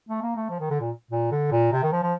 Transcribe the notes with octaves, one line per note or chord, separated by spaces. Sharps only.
A3
A#3
A3
F3
D#3
D3
A#2
A#2
D3
A#2
C3
D#3
F3
F3